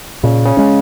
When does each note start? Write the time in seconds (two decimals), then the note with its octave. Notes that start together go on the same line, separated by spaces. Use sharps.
0.23 A#2 C#3
0.45 C#3
0.57 G#3 C#4